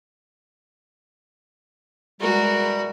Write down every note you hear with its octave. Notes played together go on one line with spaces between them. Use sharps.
B2 E3 G3 G#3 F#4 A#4